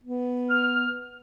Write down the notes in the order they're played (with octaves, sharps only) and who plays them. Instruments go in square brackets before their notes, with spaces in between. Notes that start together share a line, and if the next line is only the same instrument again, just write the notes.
[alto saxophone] B3
[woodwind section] F6